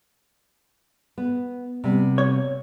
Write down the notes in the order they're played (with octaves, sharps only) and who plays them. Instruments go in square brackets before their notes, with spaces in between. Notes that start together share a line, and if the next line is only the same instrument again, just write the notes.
[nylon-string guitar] B3
C3 G3 B3
[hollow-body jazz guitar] C#5